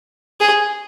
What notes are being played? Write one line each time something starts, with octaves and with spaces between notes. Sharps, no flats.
G#4